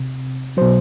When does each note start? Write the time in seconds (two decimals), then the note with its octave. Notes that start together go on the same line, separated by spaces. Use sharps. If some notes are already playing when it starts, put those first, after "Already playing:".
Already playing: C3
0.57 B2 F#3 C5